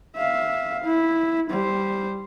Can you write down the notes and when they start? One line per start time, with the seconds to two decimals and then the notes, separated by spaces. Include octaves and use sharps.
0.17 E5 F5
0.85 E4
1.50 G3 C5